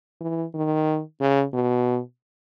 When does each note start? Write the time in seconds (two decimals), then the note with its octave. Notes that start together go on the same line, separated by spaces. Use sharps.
0.21 E3
0.54 D#3
1.20 C#3
1.53 B2